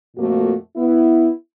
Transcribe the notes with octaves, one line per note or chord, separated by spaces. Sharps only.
F2 A#2 A3 A#3 F#4
B3 E4